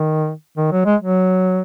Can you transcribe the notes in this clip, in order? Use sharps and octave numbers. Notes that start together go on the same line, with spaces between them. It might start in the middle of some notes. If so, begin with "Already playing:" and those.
Already playing: D#3
D#3
F#3
G#3
F#3